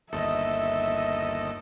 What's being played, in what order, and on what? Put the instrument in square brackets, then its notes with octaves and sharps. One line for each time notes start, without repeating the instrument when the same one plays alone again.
[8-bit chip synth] G1 D#2 A4 [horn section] D#5 [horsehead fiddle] E5